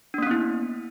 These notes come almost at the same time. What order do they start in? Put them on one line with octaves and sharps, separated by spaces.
D4 A#3 C#4 B3 E4